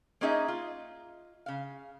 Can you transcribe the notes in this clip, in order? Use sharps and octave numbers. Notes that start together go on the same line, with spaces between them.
A#3 C#4 D#4 G#4 D#5 E5
F4
C#3 F5